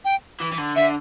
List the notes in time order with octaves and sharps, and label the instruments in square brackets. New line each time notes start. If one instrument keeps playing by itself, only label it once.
[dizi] G5
[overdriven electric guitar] E3
E3
D3
[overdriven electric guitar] D3 [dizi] E5